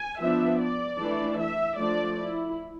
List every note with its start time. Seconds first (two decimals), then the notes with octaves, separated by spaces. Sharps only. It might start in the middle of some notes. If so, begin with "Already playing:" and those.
Already playing: G#5
0.21 F3 B3 D4 E5
0.61 D5
1.00 E3 A3 D4
1.39 E5
1.78 F3 A3 D4 D5
2.17 E4